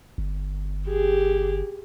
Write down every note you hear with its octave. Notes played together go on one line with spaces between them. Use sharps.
G1
G4 G#4